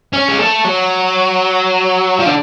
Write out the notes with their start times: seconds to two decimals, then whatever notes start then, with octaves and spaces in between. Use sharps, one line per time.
0.13 C#4
0.29 G#3
0.38 A3
0.65 F#3
2.19 F3
2.26 D3